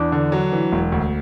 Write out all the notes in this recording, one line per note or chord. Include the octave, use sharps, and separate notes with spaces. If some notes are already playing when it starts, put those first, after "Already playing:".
Already playing: E2 D4
D3
F#3
E3
E1
D2